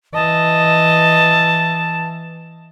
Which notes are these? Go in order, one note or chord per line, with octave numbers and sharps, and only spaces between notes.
E3 D#5 A5